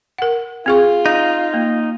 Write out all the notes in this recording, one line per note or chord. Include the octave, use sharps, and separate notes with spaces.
A#4 F#5
C4 F4 G#4 C#6
D#4
A#3